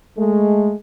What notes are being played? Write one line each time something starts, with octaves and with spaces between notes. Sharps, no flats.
G#3 A3